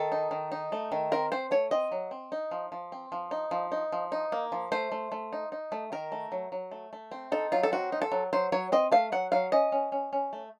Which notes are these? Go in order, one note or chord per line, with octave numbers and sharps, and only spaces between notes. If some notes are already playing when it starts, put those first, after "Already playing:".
Already playing: D#3 A4
D#4
D#3
D#4
A3
D#3
C4 A#4
C4 C5
A3 C#5
C4 D#5
F#3
C4
D#4
F3
F3
C4
F3
D#4
F3
D#4
F3
D#4
A#3
F3
A3 C5
A3
A3
D#4
D#4
A3
D#3 A#4
A3
F#3
F#3
A3
A3
C4
D#4 A4
F#3 F4
A4
C4 F#4
D#4
A4
F#3
F#3 C5
F#3 C#5
C4 D#5
A3 F5
F#3 F#5
F#3 F5
C#4 D#5
C#4
C#4
C#4
A3